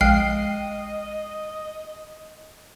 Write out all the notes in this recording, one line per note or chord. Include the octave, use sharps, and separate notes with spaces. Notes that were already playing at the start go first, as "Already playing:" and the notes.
A#1 G#3 D#5 G5 F6 C7